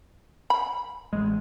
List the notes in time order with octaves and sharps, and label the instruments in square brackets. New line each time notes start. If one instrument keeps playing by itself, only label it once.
[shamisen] B5
[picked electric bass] A1 G#3